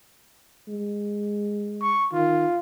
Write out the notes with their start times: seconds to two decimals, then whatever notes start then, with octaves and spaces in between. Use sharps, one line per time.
0.68 G#3
1.82 C#6
2.13 D#3 F4